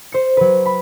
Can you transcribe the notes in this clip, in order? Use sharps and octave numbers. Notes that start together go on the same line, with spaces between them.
C5 C#7
F#3 B4
B5